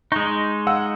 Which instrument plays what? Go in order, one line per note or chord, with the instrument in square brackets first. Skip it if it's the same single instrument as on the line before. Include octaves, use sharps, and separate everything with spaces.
[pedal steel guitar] G#3 D#4 [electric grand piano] C#6
[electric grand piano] F5 F#5 E6